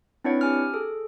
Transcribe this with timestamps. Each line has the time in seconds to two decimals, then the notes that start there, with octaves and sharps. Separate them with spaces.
0.24 C4 D4 E4 B4 C#5 F#5
0.41 G4 G#5 F6
0.74 G#4 A4